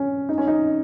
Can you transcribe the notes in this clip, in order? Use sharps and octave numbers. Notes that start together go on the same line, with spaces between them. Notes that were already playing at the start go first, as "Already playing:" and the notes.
Already playing: C#4
D#4
C#4
D#4